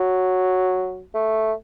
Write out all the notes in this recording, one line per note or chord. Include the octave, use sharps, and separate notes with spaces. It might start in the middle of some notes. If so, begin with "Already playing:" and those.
Already playing: F#3
A3